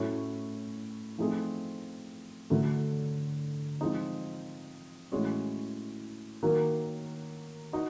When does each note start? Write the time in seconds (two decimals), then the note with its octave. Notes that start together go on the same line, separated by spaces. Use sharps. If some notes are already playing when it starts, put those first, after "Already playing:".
Already playing: A2 F#3 A3 C#4
1.18 F3 A3 C4 D#4 G#4
2.50 D3 F#3 A3
3.81 F3 G#3 C4 D#4
5.12 A2 E3 G#3 C#4 F#4
6.43 D#3 F#3 A#3
7.73 D#4 F#4